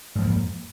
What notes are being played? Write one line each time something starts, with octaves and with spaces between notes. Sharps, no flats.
F2 G#2 F3 A#3